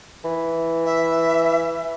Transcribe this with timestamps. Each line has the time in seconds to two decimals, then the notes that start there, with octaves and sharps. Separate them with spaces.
0.25 E3
0.85 E5